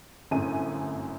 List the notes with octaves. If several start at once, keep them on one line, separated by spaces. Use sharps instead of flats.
G1 F#2 A2 C4 G#5 D#7